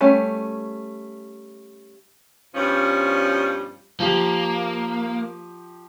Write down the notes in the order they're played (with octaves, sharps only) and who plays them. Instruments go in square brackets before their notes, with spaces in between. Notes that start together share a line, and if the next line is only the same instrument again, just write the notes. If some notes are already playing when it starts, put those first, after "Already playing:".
[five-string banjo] G3 A3 C#4
[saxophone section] G2 B2 F3 G3 C#4
[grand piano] F3 G4 [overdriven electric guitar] A#3